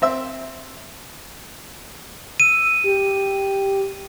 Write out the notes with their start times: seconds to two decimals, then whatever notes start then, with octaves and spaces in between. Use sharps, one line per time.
0.02 C4 E5 E6
2.40 E6 D#7
2.84 G4